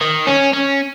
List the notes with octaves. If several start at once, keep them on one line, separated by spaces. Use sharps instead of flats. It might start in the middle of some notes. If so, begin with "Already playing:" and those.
D#3
C#4
C#4